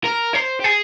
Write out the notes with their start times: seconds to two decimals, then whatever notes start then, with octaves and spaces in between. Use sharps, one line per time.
0.05 A#4
0.35 C5
0.60 G4
0.64 G#4